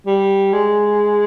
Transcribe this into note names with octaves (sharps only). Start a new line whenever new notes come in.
G3
G#3